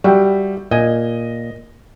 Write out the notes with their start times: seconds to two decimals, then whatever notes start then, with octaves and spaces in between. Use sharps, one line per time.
0.04 G3 F#4 E5 G5
0.71 A#2 D#5 G#5